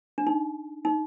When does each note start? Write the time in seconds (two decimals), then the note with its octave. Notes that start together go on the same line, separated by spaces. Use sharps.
0.18 D4
0.27 D#4
0.85 D#4